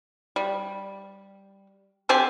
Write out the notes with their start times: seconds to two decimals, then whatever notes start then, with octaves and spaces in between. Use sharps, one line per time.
0.36 G3
2.09 D3 C4 G4 G#5